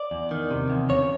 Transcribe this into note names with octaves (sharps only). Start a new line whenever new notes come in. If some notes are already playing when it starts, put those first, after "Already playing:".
Already playing: D5
E2
D#3
C3
E2
C#3 C#5